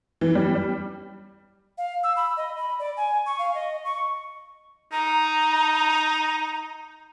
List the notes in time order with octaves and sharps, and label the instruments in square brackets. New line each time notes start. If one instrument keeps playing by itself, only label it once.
[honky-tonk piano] E3
G3
G3
[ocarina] F5
E6
B5
D#5
B5
D5
G#5
C#6
F5
D#5
C#6
[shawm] D#4 [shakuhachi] A#5